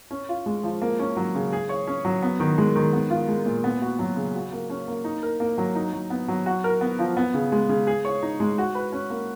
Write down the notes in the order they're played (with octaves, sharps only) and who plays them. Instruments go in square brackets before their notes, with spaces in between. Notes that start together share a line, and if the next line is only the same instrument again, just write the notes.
[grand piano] C#4
F4
G#3
F3
A#3
C#4
F#3
C#3
G#4
C#5
C#4
F#3
B3
D#3
G#3
D#3
B3
F4
G#3
A#2
B3
F#4
F#3
C#3
F#4
A#3
C#4
A#3
D#4
A#4
A#3
F#3
D#4
F#3
B3
F#3
F#4
A#4
B3
F3
B3
C#3
G#3
C#3
G#4
C#5
D#4
G#3
F#4
B4
C#4
A#3